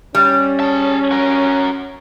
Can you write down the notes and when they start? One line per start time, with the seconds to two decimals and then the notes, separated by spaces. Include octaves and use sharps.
0.15 G3 C#4
0.60 G#4 A5
1.11 F#4 A#4